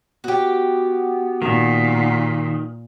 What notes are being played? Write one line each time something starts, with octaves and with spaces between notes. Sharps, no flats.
B3 F#4 G4
A#2 D#3